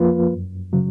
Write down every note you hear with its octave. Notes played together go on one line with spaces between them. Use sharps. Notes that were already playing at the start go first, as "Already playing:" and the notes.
Already playing: F2 F3 A#3 F4 B4
F#2
C#3 F#3